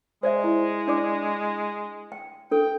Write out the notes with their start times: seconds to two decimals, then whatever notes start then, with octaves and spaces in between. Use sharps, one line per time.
0.23 G#3 C5 D5 E5
0.44 E4
0.88 D4 D5 D6
2.12 G5
2.51 D4 A4 G5